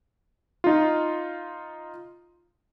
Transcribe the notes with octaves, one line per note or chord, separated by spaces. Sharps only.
D#4 F4